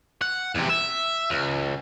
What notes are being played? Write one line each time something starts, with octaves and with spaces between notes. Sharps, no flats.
F#5
E2 C3
E5
C#2